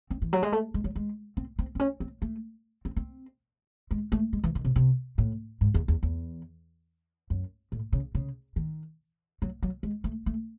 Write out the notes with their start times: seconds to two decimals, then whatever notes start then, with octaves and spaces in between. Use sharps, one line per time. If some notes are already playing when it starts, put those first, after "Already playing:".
0.10 C4
0.22 E3
0.33 F#3
0.43 G#3
0.52 A3
0.74 G#3
0.84 F#3
0.95 G#3
1.37 C4
1.59 C4
1.75 C4
1.80 C#4
2.00 C4
2.22 A3
2.85 C4
2.97 C4
3.91 G#3
4.12 A3
4.33 G#3
4.44 E3
4.55 D#3
4.65 C3
4.76 C3
5.18 A2
5.61 G#2
5.74 E2
5.88 E2
6.03 E2
7.30 F#2
7.72 A2
7.93 C#3
8.15 C#3
8.56 D#3
9.42 F#3
9.63 F#3
9.83 G#3
10.04 A3
10.26 A3